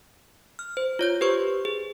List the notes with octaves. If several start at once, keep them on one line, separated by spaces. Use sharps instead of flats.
F6
C5
F4 C#5 G6
G4 B4 C5 C#6
G#4